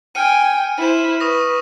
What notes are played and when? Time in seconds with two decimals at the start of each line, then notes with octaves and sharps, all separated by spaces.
0.15 G5 G#5 F6 C#7 D#7
0.78 E4 C5 D#7 E7
1.20 B4 C#6 D#6 A#6